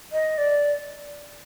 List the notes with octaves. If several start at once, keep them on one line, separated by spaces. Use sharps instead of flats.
D#5
D5